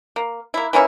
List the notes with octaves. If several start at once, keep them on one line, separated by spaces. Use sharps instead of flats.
A#3
A#3 E4
E3 A#3 C#4 E4